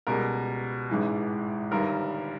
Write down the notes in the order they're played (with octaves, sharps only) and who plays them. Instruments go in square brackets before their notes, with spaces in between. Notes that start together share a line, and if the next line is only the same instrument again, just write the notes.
[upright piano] C#2 B2 G3 A#4
A1 G#2 E3 G#3
G1 G2 D#3 G3 A#4